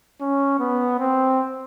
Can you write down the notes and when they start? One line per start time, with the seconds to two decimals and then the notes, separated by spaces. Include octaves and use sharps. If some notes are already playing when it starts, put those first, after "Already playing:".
0.21 C#4
0.59 B3
0.99 C4